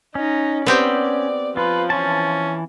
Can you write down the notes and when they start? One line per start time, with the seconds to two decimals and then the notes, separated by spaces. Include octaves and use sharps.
0.15 C#4 D#4
0.66 B3 C4 G4 D5
1.57 F3 F4 B4
1.90 E3 C#4 A5